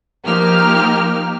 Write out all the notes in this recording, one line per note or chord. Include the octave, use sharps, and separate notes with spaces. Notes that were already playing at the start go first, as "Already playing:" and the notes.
F3 A#3 D#4 G4 F6